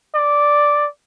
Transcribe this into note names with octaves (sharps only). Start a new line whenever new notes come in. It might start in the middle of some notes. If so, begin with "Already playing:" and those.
D5